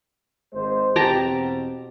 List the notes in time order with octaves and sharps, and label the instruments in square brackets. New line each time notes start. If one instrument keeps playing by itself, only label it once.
[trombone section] G#1 G#3 C5
[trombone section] E2 B2 C4 [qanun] G4 A5 A#5